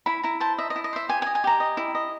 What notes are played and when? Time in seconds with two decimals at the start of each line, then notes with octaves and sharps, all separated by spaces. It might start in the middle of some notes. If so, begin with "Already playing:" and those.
0.06 E4 B5
0.23 E4 A#5
0.40 C5 A5
0.58 D#5 E5
0.70 D#5
0.76 E4
0.84 D#5
0.93 C5 E5
1.09 G4 G#5
1.22 G#5
1.27 D#5
1.35 G#5
1.44 G4 A#5
1.60 D#5
1.77 E4
1.95 D#5